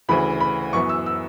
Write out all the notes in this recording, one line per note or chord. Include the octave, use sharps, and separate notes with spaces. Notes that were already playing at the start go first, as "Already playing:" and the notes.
D2 C#3 E3 B5
B5
F#2 E3 B3 C#6
E6
E6